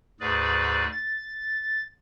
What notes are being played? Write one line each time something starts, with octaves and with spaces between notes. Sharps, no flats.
D2 G#2 G#4 B4 D5
A6